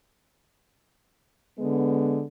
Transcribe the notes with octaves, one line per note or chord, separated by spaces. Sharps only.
D3 G#3 B3